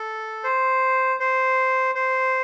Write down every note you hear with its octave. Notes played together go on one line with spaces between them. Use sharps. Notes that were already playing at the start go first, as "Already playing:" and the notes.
Already playing: A4
C5
C5
C5